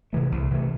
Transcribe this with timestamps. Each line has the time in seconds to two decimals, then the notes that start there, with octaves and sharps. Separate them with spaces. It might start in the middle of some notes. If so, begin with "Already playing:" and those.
0.13 C3 E3 A3
0.32 C2
0.50 C3 E3 A3